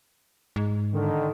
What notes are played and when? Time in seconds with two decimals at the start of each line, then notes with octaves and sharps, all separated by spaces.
0.56 G#2
0.93 D3 D#3